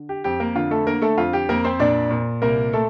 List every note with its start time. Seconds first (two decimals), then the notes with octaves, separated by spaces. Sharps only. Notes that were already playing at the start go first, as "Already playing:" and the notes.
Already playing: D3
0.09 G4
0.24 F2 G4
0.40 A#3 A#4
0.55 D3 F4
0.71 A3 A4
0.87 D3 A#3 A#4
1.02 A3 A4
1.17 F2 F4
1.33 G4
1.49 F2 A#3 A#4
1.64 C4 C5
1.80 A#2 D4 D5
2.10 A#2
2.42 C2 A#3 A#4
2.73 A3 A4